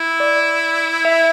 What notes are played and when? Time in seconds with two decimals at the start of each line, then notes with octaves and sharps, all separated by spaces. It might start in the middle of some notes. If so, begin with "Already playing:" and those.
Already playing: E4
0.20 D5
1.05 E5